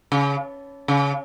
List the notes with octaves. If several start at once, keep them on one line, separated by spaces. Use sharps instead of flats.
C#3
C#3